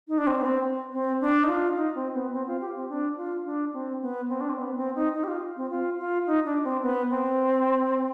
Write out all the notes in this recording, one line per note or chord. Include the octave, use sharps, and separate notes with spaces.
D#4
D4
C4
B3
C4
C4
D4
D#4
F4
D#4
C4
B3
C4
F4
G4
C4
D4
F4
D4
C4
B3
C4
D4
C4
B3
C4
D#4
D#4
G4
F4
C4
F4
F4
D#4
D4
C4
B3
C4